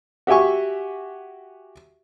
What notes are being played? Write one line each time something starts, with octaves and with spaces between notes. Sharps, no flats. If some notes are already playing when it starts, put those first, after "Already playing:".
F#4 G4 E5 G#5 C#6